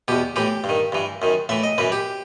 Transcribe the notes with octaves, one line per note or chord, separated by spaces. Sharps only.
E2 B2 G4
A2 E3 G4
G2
D#3
G2 E3
F#2 D#3
A2 E3 E5
D#5
F#2 E3 B4
G4